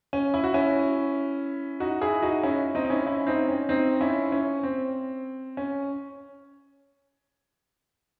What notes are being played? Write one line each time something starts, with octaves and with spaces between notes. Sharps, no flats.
C#4
E4
F#4
C#4 E4
D#4 F#4
E4 G#4
D#4 F#4
C#4 E4
C4 D#4
D#4
C#4 E4
C#4 E4
C4 D#4
C#4
C4 D#4
C#4 E4
C#4
C4
C#4